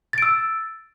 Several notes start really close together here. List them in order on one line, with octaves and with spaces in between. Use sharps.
A6 D7 E6